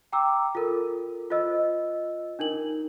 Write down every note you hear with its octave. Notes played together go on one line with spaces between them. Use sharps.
G5 A#5 D6 E6
F4 A4 A#4
F4 C5 D#5 E6
D4 D#4 A#4 F#7